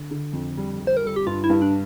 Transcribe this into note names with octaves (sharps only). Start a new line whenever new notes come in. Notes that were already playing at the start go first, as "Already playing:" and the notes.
Already playing: D3
D3
F2
G3
G3
C5
A#4
G3 A4
G4
G2 F4
E4
G2
D4